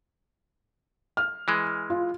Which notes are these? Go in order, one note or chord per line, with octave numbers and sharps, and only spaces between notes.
F6
E3 G#3
F4